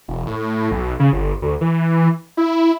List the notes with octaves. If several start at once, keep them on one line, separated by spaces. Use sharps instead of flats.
E1
A2
B1
C#3
G1
D2
E3
E4